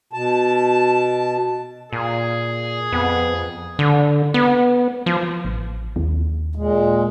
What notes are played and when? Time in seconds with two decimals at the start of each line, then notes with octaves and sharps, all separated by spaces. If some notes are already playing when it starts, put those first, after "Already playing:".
0.13 B2 A5
1.93 A#2 G#4
2.92 F2 B3
3.79 D3
4.34 B3
5.06 F3
5.45 A1
5.96 D#2
6.55 A#2 G#3